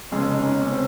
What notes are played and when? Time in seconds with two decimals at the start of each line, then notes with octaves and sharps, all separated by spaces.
0.12 F1 F2 C#3 G#3 C#4
0.33 D#4
0.42 C#4
0.61 C#4
0.72 C4